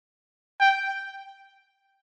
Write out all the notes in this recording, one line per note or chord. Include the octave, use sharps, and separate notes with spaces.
G5